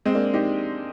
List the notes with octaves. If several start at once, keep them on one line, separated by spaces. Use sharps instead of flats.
G#3 C4
A#3 D4
D#4 G4